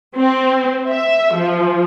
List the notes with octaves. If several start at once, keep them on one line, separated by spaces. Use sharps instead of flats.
C4
E5
F3